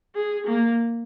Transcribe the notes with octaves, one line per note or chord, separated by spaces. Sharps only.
G#4
A#3